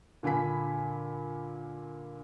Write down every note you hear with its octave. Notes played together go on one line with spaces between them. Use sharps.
A#2 D3 G#5 B5 B6